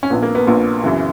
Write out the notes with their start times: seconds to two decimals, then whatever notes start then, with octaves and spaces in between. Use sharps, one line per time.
0.03 C#4
0.10 A#1 A#2 B3
0.22 A#3
0.35 B3
0.47 A#1 A#2 B3
0.84 F#2 C#3 E3